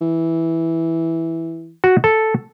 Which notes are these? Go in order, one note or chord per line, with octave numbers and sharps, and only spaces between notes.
E3
F#4
A4